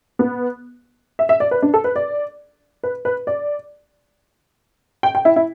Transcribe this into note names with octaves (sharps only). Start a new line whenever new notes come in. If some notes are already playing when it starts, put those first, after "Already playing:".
B3
E5
E5
D5
B4
D4
A4
B4
D5
B4
B4
D5
G5
G5
E4
E4